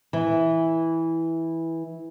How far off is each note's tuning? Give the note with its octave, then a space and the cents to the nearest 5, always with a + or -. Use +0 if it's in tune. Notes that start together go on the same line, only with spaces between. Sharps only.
E3 -10